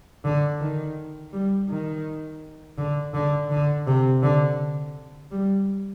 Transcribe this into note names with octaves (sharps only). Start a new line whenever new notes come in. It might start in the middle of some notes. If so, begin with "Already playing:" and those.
D3
D#3
G3
D#3
D3
D3
D3
C3
D3
G3